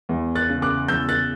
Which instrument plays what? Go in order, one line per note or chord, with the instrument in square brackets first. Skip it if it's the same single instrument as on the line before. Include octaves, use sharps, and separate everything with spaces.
[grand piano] E2
F#6 A6
C#3
D6 F#6
E2 E6 G6
F#6 A6